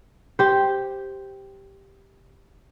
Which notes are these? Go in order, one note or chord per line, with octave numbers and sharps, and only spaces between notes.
G4 C5